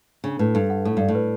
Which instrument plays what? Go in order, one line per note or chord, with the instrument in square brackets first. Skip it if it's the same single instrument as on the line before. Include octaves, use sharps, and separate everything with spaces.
[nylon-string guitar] C#3 [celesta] D4
[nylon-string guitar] A2 [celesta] B4
[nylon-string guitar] G2 [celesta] A4
[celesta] F#5
[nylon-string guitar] A2 [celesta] A4
[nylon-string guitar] G2 [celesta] D5
[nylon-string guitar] A2
[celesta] B4